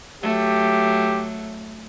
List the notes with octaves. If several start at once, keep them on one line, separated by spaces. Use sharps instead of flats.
F#3 A3 G4